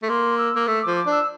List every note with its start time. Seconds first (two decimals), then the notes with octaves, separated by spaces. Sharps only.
0.03 A3
0.09 A#3 C6
0.38 E6
0.56 A#3
0.67 A3 E6
0.82 F3 D6
0.96 D6
1.06 D4 E6